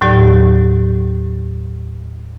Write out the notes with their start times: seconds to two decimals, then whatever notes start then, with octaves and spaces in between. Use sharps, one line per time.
0.01 D#2 A2 F#3 G4 D5